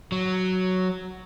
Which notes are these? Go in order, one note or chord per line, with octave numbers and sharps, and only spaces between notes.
F#3